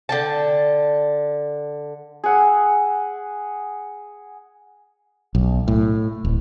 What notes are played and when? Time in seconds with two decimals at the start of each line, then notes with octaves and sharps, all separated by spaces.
0.09 D3 G5 A5
2.24 G#4 F#5 E6
5.35 B1
5.68 A2
6.25 D1